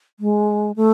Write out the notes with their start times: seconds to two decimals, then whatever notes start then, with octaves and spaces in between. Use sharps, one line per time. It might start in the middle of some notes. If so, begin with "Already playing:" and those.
0.20 G#3
0.76 A3